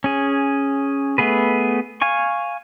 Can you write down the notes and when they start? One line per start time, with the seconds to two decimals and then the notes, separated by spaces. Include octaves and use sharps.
0.04 C#4 G#4
1.18 A3 B3 G#4 B4
2.02 F5 G#5 C#6